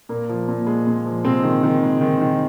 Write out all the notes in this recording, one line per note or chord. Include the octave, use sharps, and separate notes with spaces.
A#2 A#3
F3
A#2
G#3
A#2
F3
C3 G#3 C4
D#3
D#3
G#3
D#3
D#3